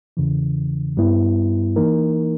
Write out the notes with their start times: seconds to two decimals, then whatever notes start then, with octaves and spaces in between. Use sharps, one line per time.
0.17 E2 C#3 E3
0.97 G2 G3 B3 E4
1.76 E3 A#3 D#4 A#4